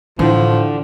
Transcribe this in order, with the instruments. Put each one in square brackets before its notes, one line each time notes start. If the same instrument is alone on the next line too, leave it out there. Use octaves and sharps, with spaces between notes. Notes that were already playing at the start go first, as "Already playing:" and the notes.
[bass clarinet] A2 [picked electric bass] D3 [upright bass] E3 [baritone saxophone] F3